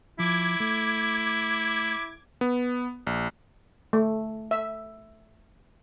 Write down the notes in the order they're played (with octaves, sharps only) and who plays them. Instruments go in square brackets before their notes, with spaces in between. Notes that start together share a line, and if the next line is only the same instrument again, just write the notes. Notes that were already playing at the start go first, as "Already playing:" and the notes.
[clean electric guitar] F3 [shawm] E4 [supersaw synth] D6 G#6
[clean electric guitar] A3
[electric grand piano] B3
A#1
[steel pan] A3
E5